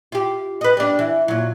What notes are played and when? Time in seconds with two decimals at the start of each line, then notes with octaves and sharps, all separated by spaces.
0.12 F4 G4
0.61 B4 D#5
0.77 G3 D4
0.99 E3
1.28 A#2 F#3